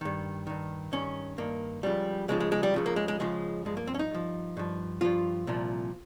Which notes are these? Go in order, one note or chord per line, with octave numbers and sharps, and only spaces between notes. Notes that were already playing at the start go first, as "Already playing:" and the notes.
G2 D#3
G2 D#3
G2 D#3 C#4
G2 D#3 A#3
C#2 C#3 F3 G3
C#2 C#3 F3 G#3
G#3
G#3
G3
C#2 C#3 F3
A#3
G#3
G#3
C#2 C#3 F3 G#3
G2 F3 G#3
A#3
C4
C#4
D#4
G2 F3
G2 F3
G2 F3 F4
C2 A#2 F3